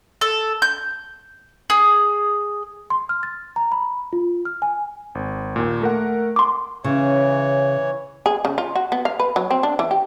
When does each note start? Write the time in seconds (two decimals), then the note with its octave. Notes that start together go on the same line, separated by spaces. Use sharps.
0.21 A4
0.62 G6
1.70 G#4
2.90 C6
3.09 F6
3.23 A6
3.56 A#5
3.72 B5
4.13 F4
4.45 F6
4.62 G#5
5.15 G#1
5.56 D#2 A#2
5.81 A3 A#4 F#5
6.36 C6 D6
6.84 C#3 E3 C#5
8.26 G#4
8.45 C#3
8.58 F4
8.76 F#4
8.92 B3
9.05 F5
9.20 B4
9.36 F#3
9.51 C4
9.63 D4
9.79 E3
9.91 G4